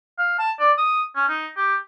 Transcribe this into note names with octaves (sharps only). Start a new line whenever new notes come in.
F5
A5
D5
D#6
C#4
D#4
G4